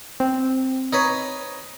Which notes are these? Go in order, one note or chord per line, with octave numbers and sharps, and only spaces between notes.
C4
D#4 B4 C#5